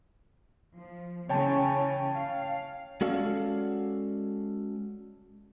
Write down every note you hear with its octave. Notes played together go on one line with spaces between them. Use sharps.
F3
C#3 E3 C#4 C#5 G5 A5
F5
G#3 C#4 F#4 A4 D5 F5